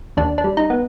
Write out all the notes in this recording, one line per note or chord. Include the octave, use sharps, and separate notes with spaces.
D#2 D4
D4
G3
D#4
B3